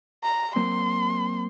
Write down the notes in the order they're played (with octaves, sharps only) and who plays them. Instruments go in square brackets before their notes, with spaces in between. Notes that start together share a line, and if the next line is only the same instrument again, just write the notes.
[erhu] A#5
[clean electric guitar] F#3 A#3 C4 [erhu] C6